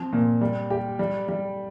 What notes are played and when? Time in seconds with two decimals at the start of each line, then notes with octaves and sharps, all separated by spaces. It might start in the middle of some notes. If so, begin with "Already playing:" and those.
Already playing: F3 C4
0.13 A#2
0.41 G3
0.70 G4
0.99 G3
1.28 G3